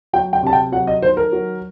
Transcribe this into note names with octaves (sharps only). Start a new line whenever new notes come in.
F#3 G5
G5
C3 A5
G5
F#3 F#5
D#5
D#3 C5
A#4
F#3